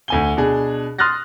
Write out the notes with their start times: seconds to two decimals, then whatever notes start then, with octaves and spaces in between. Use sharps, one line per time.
0.08 D2 G#5 G7
0.37 B2 D4 G#4
0.99 C6 D#6 F6 F#6 A6 A#6